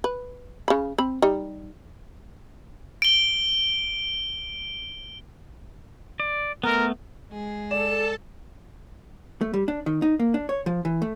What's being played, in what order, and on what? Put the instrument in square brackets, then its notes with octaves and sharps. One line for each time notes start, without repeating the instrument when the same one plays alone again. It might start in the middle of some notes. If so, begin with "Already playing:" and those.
[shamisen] B4
C#3 B5
C4 B5
G3 D#4
[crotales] D7 G7
[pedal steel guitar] D5
[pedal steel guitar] A3 B3 [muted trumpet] A#4
[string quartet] G#3 G#4
[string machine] A4 A5 [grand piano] D5 [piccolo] E7
[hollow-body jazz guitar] A3
G3
D4
D#3
D#4
A#3
D4
C#5
F3
E3
A3